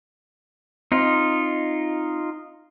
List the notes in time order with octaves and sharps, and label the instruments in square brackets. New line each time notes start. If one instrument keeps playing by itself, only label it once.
[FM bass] C4 [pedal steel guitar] D#4 F4